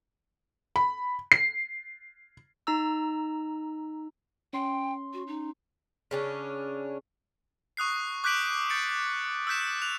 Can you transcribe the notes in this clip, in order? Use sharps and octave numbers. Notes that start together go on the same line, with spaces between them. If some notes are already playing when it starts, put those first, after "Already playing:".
B5
C7
D#4 A#5 E6
C#4 G5 C6
F#4
D#4
C#3 C#4 D4
C#6 D#6 F#6 C7
D6 F#6 G6 B6 D7 F#7
G6 A6 C#7 D7
E6 F#6 G6 B6 E7
F#6 F7